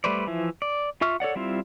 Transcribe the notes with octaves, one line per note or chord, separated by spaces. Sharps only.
G3 A3 B4 C5 D5
E3 F3 E4
D5
F4 E5 C#6 F6
A4 C#5 D5 F#5
G3 C4 E4 F4